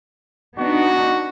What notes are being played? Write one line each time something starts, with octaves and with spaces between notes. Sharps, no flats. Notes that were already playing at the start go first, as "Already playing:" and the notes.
B3 D4 D#4 F#4